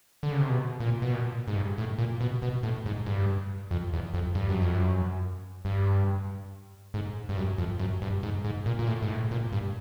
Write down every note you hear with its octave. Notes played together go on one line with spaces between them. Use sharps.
D3
C#3
C3
B2
A#2
B2
A#2
G#2
G2
A2
A#2
B2
B2
A2
G#2
G2
F2
E2
F2
G2
F#2
F2
F#2
G2
G#2
G2
F#2
F2
F#2
G2
G#2
G#2
A#2
A#2
A2
G#2
A2
A#2
G2